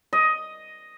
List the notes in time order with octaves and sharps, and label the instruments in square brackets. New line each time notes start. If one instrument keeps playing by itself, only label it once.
[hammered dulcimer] D#5